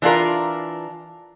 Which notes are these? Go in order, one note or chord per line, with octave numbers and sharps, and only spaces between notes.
E3 D4 F4 A#4